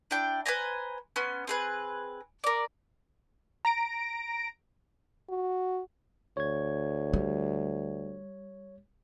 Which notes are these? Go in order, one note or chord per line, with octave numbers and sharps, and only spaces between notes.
D4 E4 G5
B4 C5 G#5 A#5
B3 C#4 C6
C4 G#4 B4
A#4 D5
A#5 A#6 D7
F#4
D2 C#5 G#6
G3